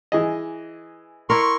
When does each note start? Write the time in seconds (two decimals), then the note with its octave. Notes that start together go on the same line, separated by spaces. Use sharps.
0.12 E3 G#4 D#5
1.30 E4 A#4 C6 C#6